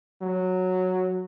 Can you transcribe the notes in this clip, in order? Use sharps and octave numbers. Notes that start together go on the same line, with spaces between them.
F#3